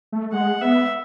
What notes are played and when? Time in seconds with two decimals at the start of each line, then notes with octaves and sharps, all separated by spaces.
0.12 A3
0.32 G#3 F#5
0.61 B3 E5